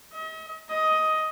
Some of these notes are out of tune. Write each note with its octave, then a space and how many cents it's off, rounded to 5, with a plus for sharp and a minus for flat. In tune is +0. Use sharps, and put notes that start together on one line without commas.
D#5 +45
D#5 +10